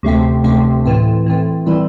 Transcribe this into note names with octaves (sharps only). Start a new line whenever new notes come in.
D2 C3 A3 C4
D2 C3 A3 C4
A2 E3 C4
A2 E3 C4
E3 G3 C4 E4